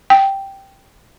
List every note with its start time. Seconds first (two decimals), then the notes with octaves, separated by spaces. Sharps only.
0.10 G5